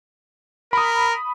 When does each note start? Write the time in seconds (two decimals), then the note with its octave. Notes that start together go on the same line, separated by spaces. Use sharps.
0.73 A#4 B5 D#6